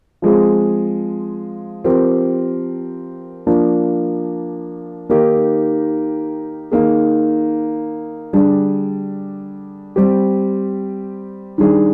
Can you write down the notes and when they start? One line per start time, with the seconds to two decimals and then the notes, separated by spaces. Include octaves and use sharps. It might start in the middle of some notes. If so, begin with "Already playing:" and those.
0.22 F3 G#3 C4 F4 G#4
1.84 F3 C4 G4 A#4
3.47 F3 A#3 D4
5.09 D#3 A#3 D#4 G4 A#4
6.71 D#3 A#3 D#4 G#4
8.33 D3 G3 D4 G#4
9.96 G3 C4 G4
11.58 D#3 G3 D4 G#4